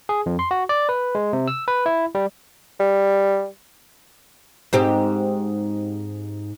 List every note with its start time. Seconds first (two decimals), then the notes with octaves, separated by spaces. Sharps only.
0.09 G#4
0.26 F2
0.39 C6
0.51 F#4
0.69 D5
0.89 B4
1.15 G#3
1.33 C3
1.48 E6
1.68 B4
1.86 E4
2.15 G3
2.80 G3
4.73 G#2 C4 G4